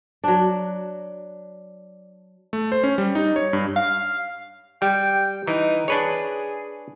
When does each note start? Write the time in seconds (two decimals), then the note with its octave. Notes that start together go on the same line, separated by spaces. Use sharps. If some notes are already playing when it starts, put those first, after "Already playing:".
0.24 F#3 D4
2.53 A3
2.72 C5
2.84 C#4
2.98 G3
3.15 D#4
3.36 C#5
3.53 G2
3.76 F5
4.82 G3 G5
5.47 E3 D#4
5.88 D4 G#4 B4 C#5